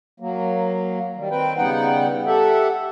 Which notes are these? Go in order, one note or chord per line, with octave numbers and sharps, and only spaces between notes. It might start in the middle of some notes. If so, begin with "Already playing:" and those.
F#3 A#3
D#3 G3
D#3 C4 B4 G5
C#3 G3 B3 D#4 F#5 G5
G4 A4 E5 F#5